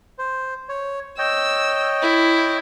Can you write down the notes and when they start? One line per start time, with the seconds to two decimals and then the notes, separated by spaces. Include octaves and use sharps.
0.19 C5
0.69 C#5
1.18 C#5 D#5 G5 E6
2.02 E4